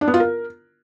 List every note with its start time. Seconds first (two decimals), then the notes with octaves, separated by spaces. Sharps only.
0.01 D4
0.08 B3
0.14 F4
0.20 A#4